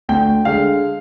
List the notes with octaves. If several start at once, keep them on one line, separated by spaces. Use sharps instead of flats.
D2 G5
D3 G#3 F5